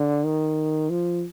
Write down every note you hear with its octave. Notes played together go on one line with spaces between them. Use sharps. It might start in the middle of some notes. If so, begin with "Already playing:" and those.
Already playing: D3
D#3
F3